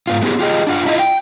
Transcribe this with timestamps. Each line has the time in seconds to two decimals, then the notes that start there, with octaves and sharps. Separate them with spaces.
0.07 G#2 B3 F4
0.22 A3 B3 E4 G4 G#4
0.39 F4 G4 G#4 D#5
0.67 D4 F4 F#5
0.86 D4 E4 F4 D#5
0.99 G5